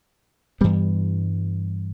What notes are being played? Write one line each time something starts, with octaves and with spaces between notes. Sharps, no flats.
G2 E3 G3 B3